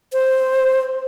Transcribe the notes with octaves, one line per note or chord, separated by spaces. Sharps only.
C5